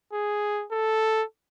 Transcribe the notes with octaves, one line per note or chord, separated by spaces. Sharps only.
G#4
A4